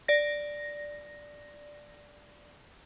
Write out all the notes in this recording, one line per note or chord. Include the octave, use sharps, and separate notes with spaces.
D5 A#6